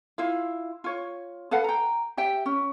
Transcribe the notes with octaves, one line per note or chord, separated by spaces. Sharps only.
E4 F4 F5
F4 C#5
A4 B4 F5 F#5
G5 A#5
G4 E5 G5
C#4